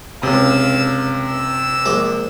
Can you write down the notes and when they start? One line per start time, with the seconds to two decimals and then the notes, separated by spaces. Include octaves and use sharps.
0.23 C#2 C3 G#3 F5 E6
1.25 E6
1.86 A#1 G#3 D6